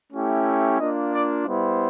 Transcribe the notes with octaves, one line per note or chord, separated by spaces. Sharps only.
A3 C#4 E4 G4
A#3 D4 F4 D#5
D5
G3 B3 E4 C5